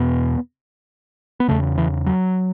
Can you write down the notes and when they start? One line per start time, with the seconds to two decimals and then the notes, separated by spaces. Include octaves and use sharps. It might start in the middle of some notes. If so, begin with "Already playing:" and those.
Already playing: E2 B2 B3
1.40 B3
1.48 E2 C#3 A3
1.78 E3
2.06 F#3